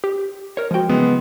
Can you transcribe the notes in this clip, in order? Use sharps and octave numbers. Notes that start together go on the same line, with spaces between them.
G4
A#4 C#5
F3 G#3 F#4 G5
C#3 E3 F#3 G#3 B3